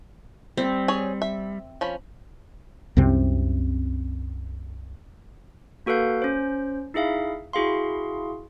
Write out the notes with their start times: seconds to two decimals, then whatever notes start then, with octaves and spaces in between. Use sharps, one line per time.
0.57 G3 C4
0.88 G#4 C#5
1.22 E5
1.81 F3 C#4 B5
2.97 C2 F#2 C3 C4
5.86 A#3 F#4 A4 B4 F5 G6
6.22 C#4 C5
6.94 D#4 E4 G#4 E5 F5
7.53 E4 F#4 G#4 F5 C6